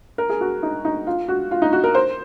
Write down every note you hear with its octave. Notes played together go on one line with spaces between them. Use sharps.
A#4
G#4
F#4
D#4
D#4
F4
F#4
F4
D#4
F#4
A#4
C5